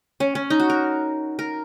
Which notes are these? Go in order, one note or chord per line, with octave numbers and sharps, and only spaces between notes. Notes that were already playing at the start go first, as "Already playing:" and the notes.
C#4
C#4
D#4
F#4
A#4
A#4